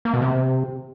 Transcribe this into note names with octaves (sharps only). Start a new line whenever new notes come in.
A#3
B2
C3